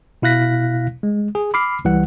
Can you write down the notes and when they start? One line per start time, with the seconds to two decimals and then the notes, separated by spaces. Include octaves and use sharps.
0.22 B2 E4 F5 F#6 A#6 B6
1.03 G#3
1.35 G#4
1.54 B5 D6 F6 C7
1.85 C2 E3 G3 F#5